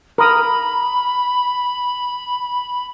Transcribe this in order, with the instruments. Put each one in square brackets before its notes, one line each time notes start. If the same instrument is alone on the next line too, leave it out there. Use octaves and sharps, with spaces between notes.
[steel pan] A#4 D#6 [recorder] B5